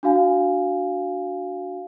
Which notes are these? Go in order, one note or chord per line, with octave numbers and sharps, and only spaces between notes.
D4 F#4 F5 G#5